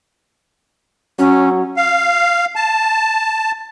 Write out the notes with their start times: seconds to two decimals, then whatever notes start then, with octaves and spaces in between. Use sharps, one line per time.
1.19 F#3 C#4
1.76 F5
2.56 A5